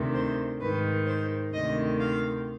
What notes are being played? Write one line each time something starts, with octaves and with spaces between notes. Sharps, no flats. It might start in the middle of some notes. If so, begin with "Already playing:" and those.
Already playing: D2 C3 D#3
C5
G#2 D#3 B4
C5
D2 C3 D#3 D#5
F5